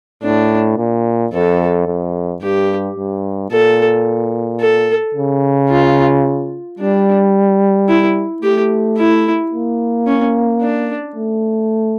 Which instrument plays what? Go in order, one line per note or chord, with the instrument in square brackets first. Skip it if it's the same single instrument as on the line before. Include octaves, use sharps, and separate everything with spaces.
[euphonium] A2 [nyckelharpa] D4
[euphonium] A#2
[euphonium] F2 [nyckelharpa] A4
[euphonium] F2
[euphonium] G2 [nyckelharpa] G4
[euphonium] G2
[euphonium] A#2 [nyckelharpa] A4
[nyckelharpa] A4
[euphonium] C#3
[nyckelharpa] F4
[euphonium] G3 [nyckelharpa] D4
[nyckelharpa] E4
[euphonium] A3 [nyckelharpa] G4
[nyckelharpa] E4
[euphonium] A#3
[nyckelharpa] C#4
D4
[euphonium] A3